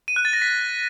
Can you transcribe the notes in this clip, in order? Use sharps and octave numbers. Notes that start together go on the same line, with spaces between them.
D#7
F#6
A6
A#6
B6